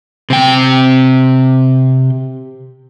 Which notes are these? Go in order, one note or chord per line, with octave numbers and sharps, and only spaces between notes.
C3 G5